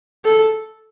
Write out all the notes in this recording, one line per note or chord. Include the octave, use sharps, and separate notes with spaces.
A4